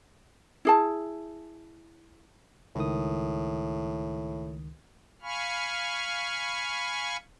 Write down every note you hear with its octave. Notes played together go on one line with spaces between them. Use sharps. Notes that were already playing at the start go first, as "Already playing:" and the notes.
E4 G#4 A5
C#2 A2 D#3 D#6
F5 G#5 B5 C#6 F6